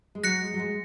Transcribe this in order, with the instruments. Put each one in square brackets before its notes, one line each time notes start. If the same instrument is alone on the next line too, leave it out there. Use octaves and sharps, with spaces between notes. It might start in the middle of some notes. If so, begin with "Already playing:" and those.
[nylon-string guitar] G#3
[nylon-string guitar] F#3 [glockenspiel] F#6 A#6 C#7
[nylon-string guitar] G#3
F#3
G#3